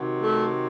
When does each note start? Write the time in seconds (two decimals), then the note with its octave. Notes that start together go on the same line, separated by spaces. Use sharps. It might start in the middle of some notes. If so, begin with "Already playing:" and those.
Already playing: C3 D#3 F#3
0.18 A3